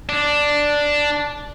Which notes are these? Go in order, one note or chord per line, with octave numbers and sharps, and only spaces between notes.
D4